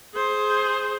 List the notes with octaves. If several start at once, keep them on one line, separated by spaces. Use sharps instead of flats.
G#4 C5